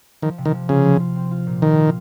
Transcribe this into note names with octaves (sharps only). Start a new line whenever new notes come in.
D#3 F3
C3
D#3
F3
C#3 F4
F3
F4
C4
F4
A#2
D#3 C4
F4